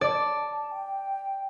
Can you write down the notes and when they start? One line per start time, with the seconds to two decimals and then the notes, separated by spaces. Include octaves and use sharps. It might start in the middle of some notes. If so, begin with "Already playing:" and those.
0.01 D5 A5
0.72 G5